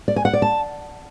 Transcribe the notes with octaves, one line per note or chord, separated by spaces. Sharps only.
D5
G#5
F#5
D5
A5